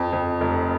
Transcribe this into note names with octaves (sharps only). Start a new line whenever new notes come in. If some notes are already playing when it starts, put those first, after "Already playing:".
Already playing: F2
F2
F1